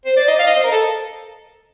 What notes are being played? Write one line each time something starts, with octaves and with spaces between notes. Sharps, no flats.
C5
D5
D#5
F5
D#5
C5
A#4
A4